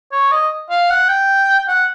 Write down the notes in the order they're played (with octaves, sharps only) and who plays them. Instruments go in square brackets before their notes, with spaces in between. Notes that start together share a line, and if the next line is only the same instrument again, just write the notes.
[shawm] C#5
D#5
F5
F#5
G5
F#5